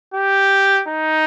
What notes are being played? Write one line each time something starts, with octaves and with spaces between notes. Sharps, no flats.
G4
D#4